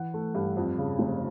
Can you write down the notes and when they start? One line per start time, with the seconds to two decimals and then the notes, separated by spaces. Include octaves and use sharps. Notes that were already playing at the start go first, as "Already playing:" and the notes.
Already playing: E3 F#5
0.14 A3
0.35 G2
0.57 F2
0.78 C#3
0.99 F1